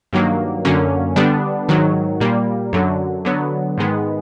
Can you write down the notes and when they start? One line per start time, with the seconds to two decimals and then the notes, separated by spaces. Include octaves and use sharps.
0.13 G2 D#3 F#3 A#3
0.65 F#2 D3 F#3 A#3 C#4
1.16 D3 G3 B3 D4
1.69 G#2 D#3 F#3
2.20 A#2 G3 A#3
2.73 F#2 D3 F#3
3.25 D3 F#3 B3
3.78 G#2 D#3 G#3 B3